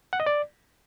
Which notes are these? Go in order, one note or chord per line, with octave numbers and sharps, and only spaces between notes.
F#5
D#5
D5